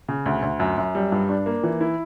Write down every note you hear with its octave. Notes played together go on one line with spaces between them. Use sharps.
C#3
D2
D2
F#2
F#2
G3
G2
D4
A#3
E3
E4